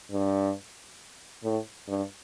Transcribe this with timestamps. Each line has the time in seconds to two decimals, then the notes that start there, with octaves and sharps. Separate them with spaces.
0.12 G2
1.44 A2
1.88 G2